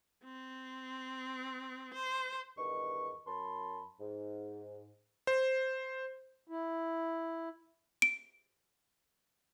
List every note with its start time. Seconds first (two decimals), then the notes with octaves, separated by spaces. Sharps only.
0.24 C4
1.94 C5
2.57 E2 G2 D#3 B4 D#5 C#6
3.26 F#2 A5 B5 C6
4.00 G#2
5.27 C5
6.48 E4
8.02 D7